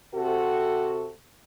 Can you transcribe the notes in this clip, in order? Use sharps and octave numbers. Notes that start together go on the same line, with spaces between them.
C3 F#4 A4